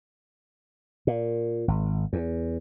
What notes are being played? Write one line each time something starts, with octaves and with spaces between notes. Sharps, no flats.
A#2
G#1
E2